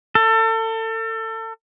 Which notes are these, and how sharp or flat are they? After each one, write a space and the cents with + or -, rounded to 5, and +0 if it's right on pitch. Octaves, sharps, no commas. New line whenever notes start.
A4 +30